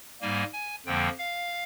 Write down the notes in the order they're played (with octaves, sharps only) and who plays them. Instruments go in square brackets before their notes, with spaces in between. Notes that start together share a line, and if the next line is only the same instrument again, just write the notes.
[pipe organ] G#2 G3 A#3 G#5
G#5
F2 D3 F3 A#3 G5
F5